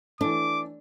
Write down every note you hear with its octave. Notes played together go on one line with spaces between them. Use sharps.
E3 A3 D4 D6